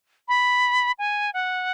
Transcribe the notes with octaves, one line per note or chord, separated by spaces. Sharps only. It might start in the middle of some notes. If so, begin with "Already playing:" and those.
B5
G#5
F#5